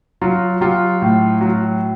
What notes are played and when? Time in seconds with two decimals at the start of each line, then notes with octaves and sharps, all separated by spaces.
0.21 F#3 F4
0.61 F#3 F4 G4
1.02 A2
1.41 F#3